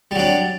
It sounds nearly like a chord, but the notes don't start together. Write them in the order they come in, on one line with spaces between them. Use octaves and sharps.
G3 F#3 D4